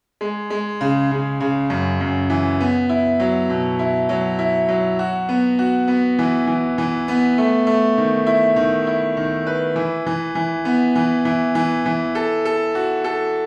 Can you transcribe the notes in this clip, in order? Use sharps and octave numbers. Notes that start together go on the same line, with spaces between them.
G#3
G#3
C#3
C#3
C#3
F#2
F#2
E3
B3
E4
F#3
B2
E4
F#3
E4
F#3
F#4
B3
F#4
B3
E3
E3
E3
B3
A3
A3
D#3
E4
D#3
E4
D#3
B4
E3
E3
E3
B3
E3
E3
E3
E3
A4
A4
F#4
A4